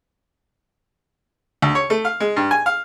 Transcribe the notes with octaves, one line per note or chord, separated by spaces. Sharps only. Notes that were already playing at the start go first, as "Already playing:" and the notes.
D2
C#5
A3
F5
G#3
G2
G#5
F5